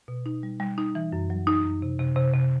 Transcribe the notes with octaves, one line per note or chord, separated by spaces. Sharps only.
B2
D#4
G3
G3
D#4
E3
F#2
F#3
D#4
F#2
C3
C3
C3
C3